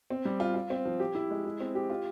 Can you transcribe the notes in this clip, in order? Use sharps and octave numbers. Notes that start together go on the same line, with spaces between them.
C4
G3
F4
F4
C4
F3
G4
E4
G#3
E4
C4
G4
F4